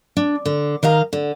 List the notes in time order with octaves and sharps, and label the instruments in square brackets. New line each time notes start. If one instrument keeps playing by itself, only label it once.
[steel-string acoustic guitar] D4
D3
D#3 D#5 F5 A#5
D3